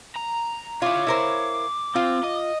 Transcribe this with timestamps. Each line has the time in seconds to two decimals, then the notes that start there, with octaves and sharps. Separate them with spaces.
0.16 A#5
0.82 E4 F4 C#5 F5 D6
1.07 E4 A#4 C5
1.96 C4 F4
2.24 D#5